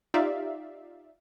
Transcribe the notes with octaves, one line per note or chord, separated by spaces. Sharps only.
D#4 F4 G4 D5 E5 F5